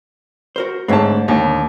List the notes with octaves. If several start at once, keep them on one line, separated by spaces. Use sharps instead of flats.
F#4 A#4 C5
G#2 D3 A3 C4 C#5 A5
D#2 A#2 D3 D#4